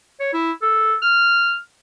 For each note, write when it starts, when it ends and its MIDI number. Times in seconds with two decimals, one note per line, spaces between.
0.20 0.30 73
0.33 0.52 64
0.62 0.95 69
1.02 1.56 89